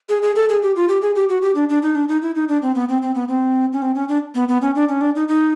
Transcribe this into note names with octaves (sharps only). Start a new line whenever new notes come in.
G#4
G#4
A4
G#4
G4
F4
G4
G#4
G4
F#4
G4
D4
D4
D#4
D4
D#4
E4
D#4
D4
C4
B3
C4
C4
B3
C4
C#4
C4
C#4
D4
B3
B3
C#4
D4
C#4
D4
D#4
D#4